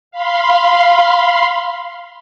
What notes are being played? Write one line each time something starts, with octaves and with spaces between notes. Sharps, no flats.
F5 B5 C6